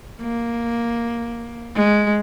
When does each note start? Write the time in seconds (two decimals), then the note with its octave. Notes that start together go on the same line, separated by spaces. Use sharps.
0.21 A#3
1.75 G#3